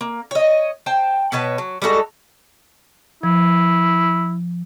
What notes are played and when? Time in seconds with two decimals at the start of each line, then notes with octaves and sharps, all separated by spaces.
0.01 A#3
0.31 C#5 D#5
0.86 C5 G5 A5
1.32 B2 B4 C#5 A5
1.58 F#3
1.82 G3 G#3 F#4 A4
3.23 F3 E4